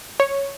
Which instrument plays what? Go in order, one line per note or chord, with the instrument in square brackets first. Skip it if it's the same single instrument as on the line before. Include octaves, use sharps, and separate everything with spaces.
[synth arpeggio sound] C#5